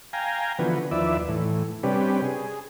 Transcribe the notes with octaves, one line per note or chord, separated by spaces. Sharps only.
F5 G5 G#5 A#5
D3 E3 F3 B3 F#4 B4
D#2 F3 E4 B4 D5 E5
A2 E3
C3 G3 C#4 D4 G4 B4
G#4